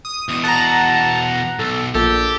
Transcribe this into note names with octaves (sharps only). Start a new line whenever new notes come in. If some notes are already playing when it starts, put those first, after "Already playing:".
D#6
E2 B2
F#5 A5 A#5
B1 A4
A#1 G4 A4